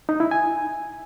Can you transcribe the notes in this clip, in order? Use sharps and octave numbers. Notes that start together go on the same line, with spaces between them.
D#4
E4
G#5